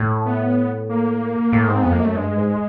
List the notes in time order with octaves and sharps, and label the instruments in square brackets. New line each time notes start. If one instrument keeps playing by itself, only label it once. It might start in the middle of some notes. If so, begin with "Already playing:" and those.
Already playing: [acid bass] A2
[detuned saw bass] B3
A#3
[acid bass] A2
[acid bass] G#2 [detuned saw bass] C4
[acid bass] F2 [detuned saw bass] B3
[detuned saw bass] A#3
[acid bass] F#2 [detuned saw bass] A3
[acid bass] G2 [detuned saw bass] G#3
[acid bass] G#2